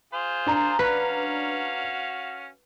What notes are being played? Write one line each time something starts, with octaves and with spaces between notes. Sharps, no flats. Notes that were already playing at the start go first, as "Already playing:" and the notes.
F4 G#4 C5
D4 A#5
C#4 F#4 B4 F5